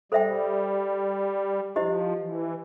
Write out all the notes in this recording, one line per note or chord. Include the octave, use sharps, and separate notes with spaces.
G3 A4 C5 E5 G5
F3 E4 G4 C5 D#5
E3